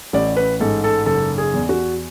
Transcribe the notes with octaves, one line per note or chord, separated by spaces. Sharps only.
A1 D5
B4
G#2 A4
A4
F#1 A4
G#4
E2
F#4